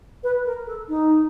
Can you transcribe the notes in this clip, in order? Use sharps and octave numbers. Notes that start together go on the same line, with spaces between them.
B4
A#4
A4
D#4